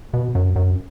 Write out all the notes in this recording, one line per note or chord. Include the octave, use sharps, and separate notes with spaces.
B2
F#2
F#2